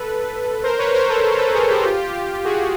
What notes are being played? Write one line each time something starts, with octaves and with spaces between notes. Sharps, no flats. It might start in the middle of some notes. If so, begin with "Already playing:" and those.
Already playing: A4 B4
A#4 C5
B4 C#5
A#4 C5
A4 B4
A4 B4
A4 B4
G#4 A#4
G4 A4
F4 G4
F#4 G#4